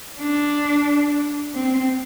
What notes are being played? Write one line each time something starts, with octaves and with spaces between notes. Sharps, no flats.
D4
C4